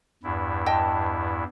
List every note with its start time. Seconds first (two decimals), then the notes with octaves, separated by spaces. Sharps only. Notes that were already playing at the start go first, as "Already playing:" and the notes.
0.23 E2 G2 E4
0.66 D#5 G5 A5